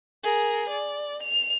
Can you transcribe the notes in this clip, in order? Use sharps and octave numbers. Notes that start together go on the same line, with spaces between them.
G#4 A#4
D5
F7